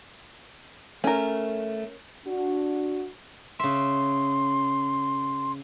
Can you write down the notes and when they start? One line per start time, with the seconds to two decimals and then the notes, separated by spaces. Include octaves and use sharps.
1.04 A3 C#4 A#4
2.26 D4 F#4
3.59 C#3 E5 C6